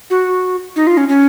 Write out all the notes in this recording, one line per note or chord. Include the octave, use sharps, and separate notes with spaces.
F#4
D#4
F4
C#4
C#4